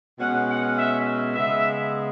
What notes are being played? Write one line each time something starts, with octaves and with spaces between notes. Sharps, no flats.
B2 G#3 C#4 F#5
F#5
E5
C#3 G#3 B3 E5